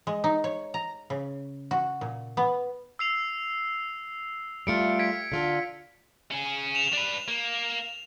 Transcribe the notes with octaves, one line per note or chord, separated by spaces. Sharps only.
G#3
D#4
C#5
A#5
C#3
F#4
A#2
B3
E6 C7 F7
G3 A3 F4 C#7 D7
G#6 B6 D7
D3 F4 A4
C#4 G#4
E7 F7
D4 B4
A#3